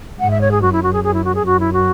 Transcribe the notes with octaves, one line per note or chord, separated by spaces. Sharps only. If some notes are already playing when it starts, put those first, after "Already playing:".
G#2 F#5
E5
C#5
G#4
F#2 F#4
E4
F#4
G#4
G#4
E4
F#4
G#4
F#2 F#4
E4
F#4